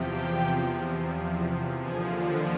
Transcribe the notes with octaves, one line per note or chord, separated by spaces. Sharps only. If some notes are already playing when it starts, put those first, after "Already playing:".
Already playing: E2 C3 F3 G4 G5
D#2 D3 F3 G#4 G#5